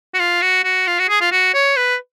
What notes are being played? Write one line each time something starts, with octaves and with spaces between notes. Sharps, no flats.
F#4
F4
F#4
F#4
F4
F#4
G#4
F4
F#4
C#5
B4